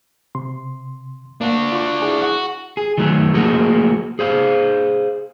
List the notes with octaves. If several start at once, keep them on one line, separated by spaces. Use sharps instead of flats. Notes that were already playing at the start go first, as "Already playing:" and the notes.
C3 C6
A#3 D4 F#4
F4 C#6
E4 G#4
F#4
G#4
D#3 F#3 A3
F3 A3 A#3 F#4 G#4 A#4
G#4 C5 F5